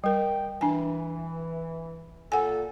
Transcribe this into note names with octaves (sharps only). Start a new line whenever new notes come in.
G3 A#4 G5
E3 D4 G#5
A#2 A4 F#5 G#5